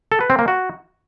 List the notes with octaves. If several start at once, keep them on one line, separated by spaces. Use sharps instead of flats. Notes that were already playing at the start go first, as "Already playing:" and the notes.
A4
B4
C4
A#3
F#4